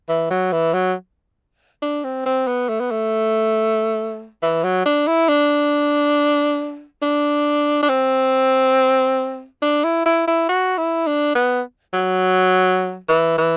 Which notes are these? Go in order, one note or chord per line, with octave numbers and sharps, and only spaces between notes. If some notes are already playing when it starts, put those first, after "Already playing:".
E3
F#3
E3
F#3
D4
C4
C4
B3
A3
B3
A3
E3
F#3
D4
E4
D4
D4
D4
C4
D4
E4
E4
E4
F#4
E4
D4
B3
F#3
E3
E3